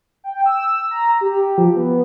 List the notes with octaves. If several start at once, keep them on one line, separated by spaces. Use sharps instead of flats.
G5
E6
A#5
G4
F3
B3